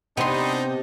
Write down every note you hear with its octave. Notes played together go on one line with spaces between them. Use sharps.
C3 B3 C4 D4 D#4 C6